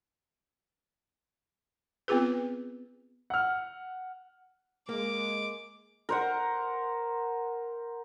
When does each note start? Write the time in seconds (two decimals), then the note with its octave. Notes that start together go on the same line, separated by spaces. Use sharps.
2.08 B3 C4 F4 G#4 B4
3.30 F#5 F6
4.89 G#3 A#3 D6
6.09 A#4 C5 F#5